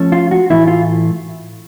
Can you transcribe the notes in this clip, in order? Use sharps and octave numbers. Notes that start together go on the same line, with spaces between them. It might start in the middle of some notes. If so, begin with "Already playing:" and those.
Already playing: F3 A3 C#4
F4
F#4
A2 E3 A3 E4
F4